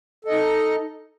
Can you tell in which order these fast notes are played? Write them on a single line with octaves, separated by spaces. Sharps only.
A4 D#5 D#4